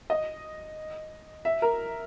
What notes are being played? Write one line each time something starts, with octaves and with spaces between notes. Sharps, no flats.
D#5
E5
A#4